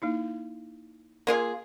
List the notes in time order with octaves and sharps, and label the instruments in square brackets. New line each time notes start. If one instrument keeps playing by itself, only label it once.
[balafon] A#3 D#4 E4
[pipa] A#3 F4 G#4 [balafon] C6